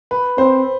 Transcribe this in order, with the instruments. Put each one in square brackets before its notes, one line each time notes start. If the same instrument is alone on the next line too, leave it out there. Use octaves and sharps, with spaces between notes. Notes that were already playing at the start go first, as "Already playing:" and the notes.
[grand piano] B4
[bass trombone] C4 [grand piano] C5